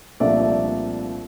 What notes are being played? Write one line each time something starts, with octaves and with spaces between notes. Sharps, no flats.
C2 A#2 F3 A3 D4 D5 E5